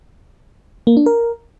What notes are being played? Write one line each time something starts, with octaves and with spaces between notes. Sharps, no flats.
A#3
D4
A#4